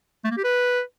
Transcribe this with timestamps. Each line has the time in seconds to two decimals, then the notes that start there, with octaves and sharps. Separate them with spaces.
0.25 A3
0.31 A#3
0.37 G4
0.44 B4